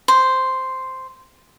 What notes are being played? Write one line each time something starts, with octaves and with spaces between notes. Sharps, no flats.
C5